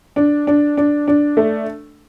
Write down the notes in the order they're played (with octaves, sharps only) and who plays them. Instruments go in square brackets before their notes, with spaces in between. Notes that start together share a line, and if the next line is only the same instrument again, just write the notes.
[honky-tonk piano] D4
D4
D4
D4
A3